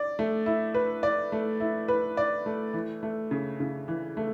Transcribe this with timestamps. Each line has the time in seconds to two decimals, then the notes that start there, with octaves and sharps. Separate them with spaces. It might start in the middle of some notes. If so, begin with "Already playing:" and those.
Already playing: D5
0.19 A3
0.46 E4
0.74 B4
1.03 D5
1.32 A3
1.60 E4
1.88 B4
2.17 D5
2.46 A3
2.74 E3
3.03 A3
3.31 C#3
3.60 C#3
3.88 E3
4.17 A3